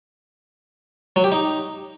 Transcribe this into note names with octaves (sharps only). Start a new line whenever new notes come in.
F#3
G4
D#4